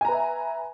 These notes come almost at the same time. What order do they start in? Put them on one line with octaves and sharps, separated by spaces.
G#5 A#5 B4 E5